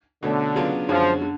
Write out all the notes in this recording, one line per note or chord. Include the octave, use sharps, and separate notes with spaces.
B2 D3 A3 C#4
C#3 F#3 B3 D4 F4
F#2 D3 F3 G#3 C#4
D3